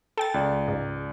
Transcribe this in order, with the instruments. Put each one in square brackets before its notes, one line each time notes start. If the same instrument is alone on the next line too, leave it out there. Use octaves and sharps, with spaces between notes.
[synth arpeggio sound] A4 G5 A6
[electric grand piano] C#2 D5
[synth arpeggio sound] G#2